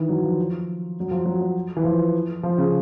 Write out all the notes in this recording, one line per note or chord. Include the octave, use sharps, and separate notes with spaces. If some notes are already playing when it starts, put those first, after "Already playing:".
Already playing: D#3 E3
F#3
F3
F#3
F3
F#3
F#3
E3
F3
F3
C#3